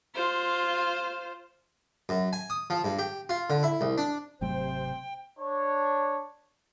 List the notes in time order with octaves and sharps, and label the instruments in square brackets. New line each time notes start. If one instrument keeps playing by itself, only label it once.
[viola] F4 C5
[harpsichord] F#2
G#5
D#6
F3
G2
G4
F4
D3
E4
C2
D4
[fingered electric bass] G#1 F#3 A3 [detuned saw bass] C3 [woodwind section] C5 [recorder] G5
[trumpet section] D4 C#5